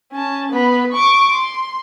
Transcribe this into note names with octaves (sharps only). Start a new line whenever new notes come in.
C#4 A5
B3 B5
C#6 D6
C6